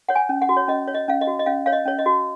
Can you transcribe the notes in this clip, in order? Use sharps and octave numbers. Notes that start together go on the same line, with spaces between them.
C#5 F#5
G#5
C#4
F#5
F#4
C#5
C#4 D#5
C#5
D#5
C#4 F5
D#5
F#4
D#5
C#4 F5
C#5 F5
D#5
C#4 C#5
D#5
F#4